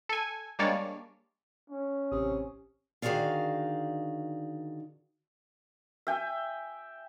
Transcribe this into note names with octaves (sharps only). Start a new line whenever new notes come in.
A4 G#5
G3 G#3 A#3 D4 C#5 D5
C#4
A1 C3 D#6
D3 D#3 F#4 G#4 D5 F5
E5 G5 G#5